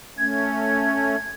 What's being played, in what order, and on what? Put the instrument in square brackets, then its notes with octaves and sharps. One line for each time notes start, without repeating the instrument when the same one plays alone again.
[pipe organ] A3 C#4 [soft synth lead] G#6